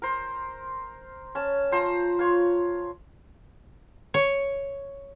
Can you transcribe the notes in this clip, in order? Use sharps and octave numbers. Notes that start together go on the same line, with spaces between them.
A#4 C5
C#4 A5
F3 C5 A#5
F4 C#5
C#5